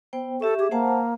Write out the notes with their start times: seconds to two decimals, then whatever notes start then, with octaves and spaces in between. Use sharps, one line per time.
0.13 B3 C5 G5
0.41 G4 A4 E5 C#6
0.59 G4 G#4 E5
0.71 A#3 C5 F#5 A5